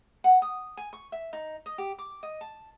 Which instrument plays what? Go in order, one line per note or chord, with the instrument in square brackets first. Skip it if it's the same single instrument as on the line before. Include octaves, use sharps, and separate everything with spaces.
[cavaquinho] F#5
D#6
G#5
C#6
E5
D#4
D#5
G4
D6
D#5
A5